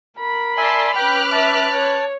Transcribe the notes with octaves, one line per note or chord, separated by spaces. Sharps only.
A#4 B5
D5 E5 G#5 A5 C6
C#4 B4 G5 D6 F6 F#6
E5 A5
C#5